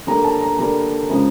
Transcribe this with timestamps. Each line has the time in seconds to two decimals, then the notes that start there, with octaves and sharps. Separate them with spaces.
0.07 D3 G3 A#3 A#5
0.24 A5
0.41 A#5
0.59 D3 G3 A#3 A#5
1.10 C#3 F3 G#3